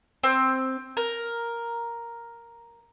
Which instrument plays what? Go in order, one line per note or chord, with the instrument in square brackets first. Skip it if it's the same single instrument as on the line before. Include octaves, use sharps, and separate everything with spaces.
[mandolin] C4
A#4